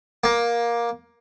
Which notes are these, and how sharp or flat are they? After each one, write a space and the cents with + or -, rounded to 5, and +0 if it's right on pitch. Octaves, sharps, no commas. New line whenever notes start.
A#3 +15